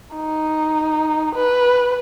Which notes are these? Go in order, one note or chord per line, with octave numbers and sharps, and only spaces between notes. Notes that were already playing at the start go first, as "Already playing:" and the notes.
D#4
B4